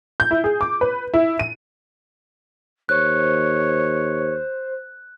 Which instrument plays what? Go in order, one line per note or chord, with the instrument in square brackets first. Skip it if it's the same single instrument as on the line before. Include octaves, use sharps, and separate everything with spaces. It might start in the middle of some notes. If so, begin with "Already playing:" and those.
[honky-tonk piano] G6
E4
G#4
D6
B4
E4
D#7
[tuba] D#2 [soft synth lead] C5 [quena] C#5 [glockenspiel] F#6